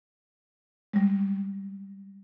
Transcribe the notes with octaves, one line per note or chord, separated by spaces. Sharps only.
G3 G#3